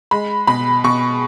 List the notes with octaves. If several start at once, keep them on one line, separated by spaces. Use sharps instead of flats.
G#3 B5
B2 B5
B2 C#6